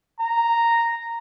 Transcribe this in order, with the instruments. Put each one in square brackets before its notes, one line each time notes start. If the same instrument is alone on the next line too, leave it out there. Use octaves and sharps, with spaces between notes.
[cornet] A#5